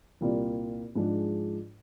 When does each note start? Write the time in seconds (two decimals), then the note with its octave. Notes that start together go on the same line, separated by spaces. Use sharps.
0.21 C2 A#2 G3 A#3 F4
0.95 G#2 F3 G#3 D4